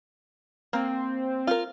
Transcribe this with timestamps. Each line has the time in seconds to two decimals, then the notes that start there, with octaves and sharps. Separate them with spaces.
0.73 A#3 C4
1.47 F4 A#4